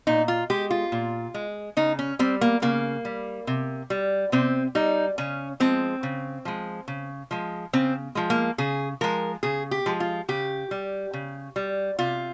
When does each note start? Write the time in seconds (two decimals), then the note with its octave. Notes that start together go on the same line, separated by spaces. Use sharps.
0.07 A#2 D#4
0.28 F4
0.50 G#3 G4
0.70 F4
0.92 A#2
1.34 G#3
1.77 C#3 D#4
1.99 C#4
2.19 G3 C4
2.41 A#3
2.62 C#3 A#3
3.05 G3
3.47 C3
3.90 G3
4.32 C3 C4
4.75 G3 D#4
5.18 C#3 C#4
5.60 F3 G#3 C4
6.03 C#3
6.45 F3 G#3
6.88 C#3
7.31 F3 G#3
7.73 C#3 C4
8.15 F3 G#3
8.30 A#3
8.58 C#3 G#4
9.01 F3 G#3 A#4
9.43 C#3 G#4
9.71 G4
9.86 F3 G#3
10.00 F4
10.28 C#3 G4
10.71 G3
11.13 C#3
11.56 G3
11.99 C3 F4